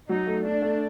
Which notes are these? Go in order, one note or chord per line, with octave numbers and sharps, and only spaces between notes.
F#3 D#4
A3
A3 D4
A3